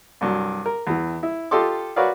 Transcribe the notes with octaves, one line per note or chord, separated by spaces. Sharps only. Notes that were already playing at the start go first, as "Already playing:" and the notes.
C2 G2 F#3
A#4
E2 E3
E4
F4 G4 A4 D#5 C6 D6
F#4 A#4 B4 C#5 D5 F5